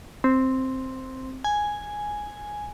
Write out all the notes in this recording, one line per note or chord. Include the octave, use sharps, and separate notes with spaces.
C4
G#5